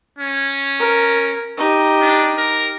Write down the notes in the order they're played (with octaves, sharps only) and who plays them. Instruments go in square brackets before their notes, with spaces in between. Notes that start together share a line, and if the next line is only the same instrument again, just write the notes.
[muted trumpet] C#4
[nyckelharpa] A#4
D#4 G4
[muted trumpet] D4
A#4